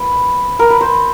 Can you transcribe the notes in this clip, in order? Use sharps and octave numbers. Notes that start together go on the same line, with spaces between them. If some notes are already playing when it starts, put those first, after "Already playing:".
Already playing: B4
A#4
B4
C5